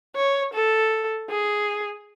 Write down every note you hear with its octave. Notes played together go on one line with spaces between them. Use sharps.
C#5
A4
G#4